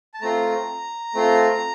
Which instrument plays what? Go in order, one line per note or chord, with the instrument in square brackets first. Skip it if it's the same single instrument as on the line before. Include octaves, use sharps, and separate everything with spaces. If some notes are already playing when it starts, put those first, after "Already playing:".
[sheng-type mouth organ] A5
A3 C4 F4 A#5
A3 C4 F4